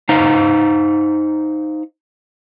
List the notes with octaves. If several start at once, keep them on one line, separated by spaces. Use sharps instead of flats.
D#4 C5 F5 A#5